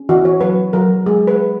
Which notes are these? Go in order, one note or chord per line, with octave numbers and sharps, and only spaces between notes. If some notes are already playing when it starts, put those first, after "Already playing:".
Already playing: C#4
E3 F#4
C#5
F#3 B4
F#3 A#4
G#3 G#4
B4
G#3